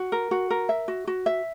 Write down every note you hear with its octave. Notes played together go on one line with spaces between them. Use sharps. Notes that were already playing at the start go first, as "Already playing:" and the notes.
Already playing: F#4
A#4
F#4
A#4
E5
F#4
F#4
E5